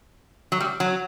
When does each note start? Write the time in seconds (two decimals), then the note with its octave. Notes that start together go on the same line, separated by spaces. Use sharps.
0.52 F#3
0.60 G3
0.80 F#3